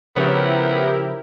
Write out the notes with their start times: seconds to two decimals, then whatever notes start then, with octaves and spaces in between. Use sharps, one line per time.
0.16 C#3 F3 B3 E4 G4 A#4 C#5